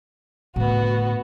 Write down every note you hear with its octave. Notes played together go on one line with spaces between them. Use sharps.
A2 D3 B3 F#4